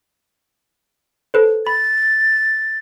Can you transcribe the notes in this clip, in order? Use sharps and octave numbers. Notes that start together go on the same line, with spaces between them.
A4 B4 C5
B5 A6